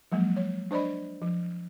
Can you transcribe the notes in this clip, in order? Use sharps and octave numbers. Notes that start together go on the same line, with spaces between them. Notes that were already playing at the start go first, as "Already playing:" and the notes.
F3 F#3 G#3 A#3
C#5
D4 C5 D5 D#5 B5
F3